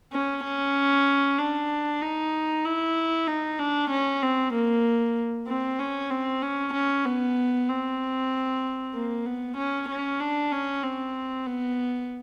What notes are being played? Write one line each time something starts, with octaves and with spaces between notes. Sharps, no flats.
C#4
C#4
D4
D#4
E4
D#4
D4
C#4
C4
A#3
C4
C#4
C4
C#4
C#4
B3
C4
A#3
B3
C#4
C#4
D4
C#4
C4
B3